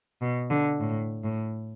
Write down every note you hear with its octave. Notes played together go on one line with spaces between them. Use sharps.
B2
D3
A2
A2